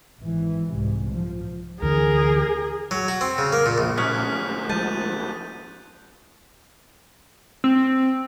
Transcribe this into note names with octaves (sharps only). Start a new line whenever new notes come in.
G#1 E3
C2 G#2
F3
D2 D3 E3 G#4 A#4
F#3
F#4
C4
C#3
A#3
A#2
A#1
D2 G#2 C#4 D#6 F#6 B6
F3 G#3 A5 G6 D#7
C4